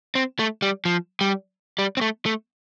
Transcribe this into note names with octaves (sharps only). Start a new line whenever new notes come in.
C4
A3
G3
F3
G3
G3
C4
A3
A3